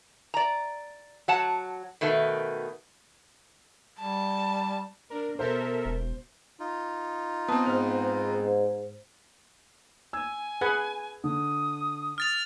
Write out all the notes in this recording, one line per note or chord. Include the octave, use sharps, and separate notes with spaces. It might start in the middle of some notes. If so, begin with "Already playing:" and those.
D5 A#5
F#3 F#5 A5
B2 D#3 A3 B3
G3 A5
D4 A#4
B2 A4 A#4 C5 E5
E1
D#4 F4
B3 C4 A5 D#6
G#2 C5 F6
G#5 E6 G#6
G#4 B4 F#5 G#6
D3 D#6
F6 A6 F7